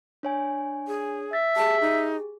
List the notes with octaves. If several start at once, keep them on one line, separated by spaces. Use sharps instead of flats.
D4 C#5 G#5
G#4
E5 A6
G4 G#4 A5
D#4